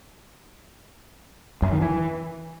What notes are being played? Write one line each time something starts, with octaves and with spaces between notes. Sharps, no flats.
F#2
D#3
E3